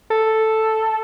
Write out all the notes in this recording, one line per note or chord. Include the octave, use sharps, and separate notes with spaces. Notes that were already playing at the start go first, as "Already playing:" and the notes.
A4